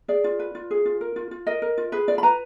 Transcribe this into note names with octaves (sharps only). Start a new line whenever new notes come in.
G#4 D5
F4
B4
F4
G#4
F4
A#4
F4
F4
A#4 D#5
A#4
F4
G#4 B4
F4 D5
B5
B4 A#5